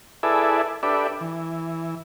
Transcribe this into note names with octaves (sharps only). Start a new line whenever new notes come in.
E4 G#4 A4 B4 D5 E5
D4 G4 A4 B4 D5 E5
E3